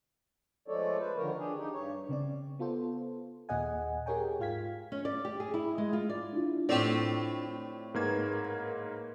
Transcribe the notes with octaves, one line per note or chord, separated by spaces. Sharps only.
F3 G#3 A3 A4 C#5 D5
B4 C5
D3 D#3 F3 A#3 A#4 C#5
D4 G4 G#4
D#4 G4
G2 C#5
C#3 C4 D5
B3 F4 A4 C5
D#2 A#2 G#4 D#5 F#5 G#5
G4 G#4 A#4 C#5 G5 G#5
G#2 F4 F5 G#6 B6
C#4
D5
G4
G#4
E4
G#3
F4
D5
D4 E4 F4
A2 A3 C4 G4 D5
G#2 A#3 G#4 A#4 B4 G#6